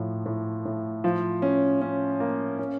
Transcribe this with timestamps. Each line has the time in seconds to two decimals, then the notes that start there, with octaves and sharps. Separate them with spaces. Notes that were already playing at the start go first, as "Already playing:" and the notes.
Already playing: A2 F3
0.26 A2
0.65 A2
1.04 F3
1.42 C#4
1.81 C#4
2.20 A#3
2.59 C#4